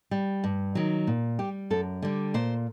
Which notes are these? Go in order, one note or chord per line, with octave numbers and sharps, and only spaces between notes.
G3
G2
D#3 F#3
A#2
G3 G4
F#2 A4
D3 G3
A#2 C5